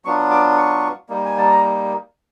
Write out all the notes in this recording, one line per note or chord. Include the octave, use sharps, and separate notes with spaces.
F#3 B3 D4 F4 C#6
D6
C#6
G3 A#3 D#4
G#5
A5
A#5